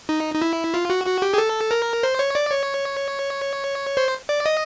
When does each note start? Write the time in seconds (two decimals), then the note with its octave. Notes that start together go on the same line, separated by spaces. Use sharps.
0.09 D#4
0.35 D#4
0.42 E4
0.74 F4
0.90 F#4
1.06 F#4
1.22 G4
1.34 G#4
1.38 A4
1.71 A#4
2.03 C5
2.19 C#5
2.35 D5
2.52 C#5
3.97 C5
4.29 D5
4.46 D#5